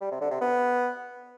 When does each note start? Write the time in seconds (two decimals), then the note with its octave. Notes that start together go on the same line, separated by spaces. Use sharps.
0.01 G3
0.11 C3
0.21 D3
0.31 C3
0.41 B3